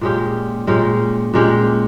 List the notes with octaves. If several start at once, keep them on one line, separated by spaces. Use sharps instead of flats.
A#2 G#3 C#4 G4
A#2 G#3 C#4 G4
A#2 G#3 C#4 G4